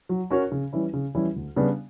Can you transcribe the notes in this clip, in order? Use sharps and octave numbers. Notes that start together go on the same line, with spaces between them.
F#3
C#4 F#4 A#4 C#5
C#3
E3 G3 C#4 E4
C#3
E3 G3 C#4 E4
D2
C#3 G3 B3 D4